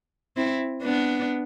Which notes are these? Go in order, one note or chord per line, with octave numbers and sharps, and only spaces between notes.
C4 E4
B3 D4